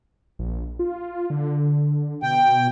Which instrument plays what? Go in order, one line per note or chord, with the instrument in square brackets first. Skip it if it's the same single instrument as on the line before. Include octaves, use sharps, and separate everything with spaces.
[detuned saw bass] A#1
F4
D3
[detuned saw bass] B2 [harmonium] G5